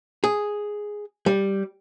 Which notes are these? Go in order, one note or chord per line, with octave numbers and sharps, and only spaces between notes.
G#4
G3